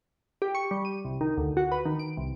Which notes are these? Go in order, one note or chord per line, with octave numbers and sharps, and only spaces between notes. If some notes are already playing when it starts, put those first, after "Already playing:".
G4
C#6
G3
D#7
C2
D#3
D2
F#4
B4
D#3
D7
C2